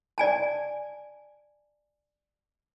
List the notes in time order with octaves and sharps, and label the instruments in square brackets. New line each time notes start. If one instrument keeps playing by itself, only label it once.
[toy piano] D5 G#5 A5